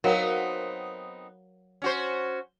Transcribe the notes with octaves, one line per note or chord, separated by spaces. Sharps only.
F#3 B3 C4 D#4 A#4 F5 F#5
C#4 F#4 C5